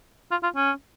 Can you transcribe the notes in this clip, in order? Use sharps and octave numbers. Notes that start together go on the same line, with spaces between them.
F4
F4
C#4